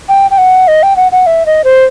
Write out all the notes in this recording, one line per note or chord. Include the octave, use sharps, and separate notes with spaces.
G5
G5
F#5
D#5
G5
F#5
F#5
E5
D#5
C5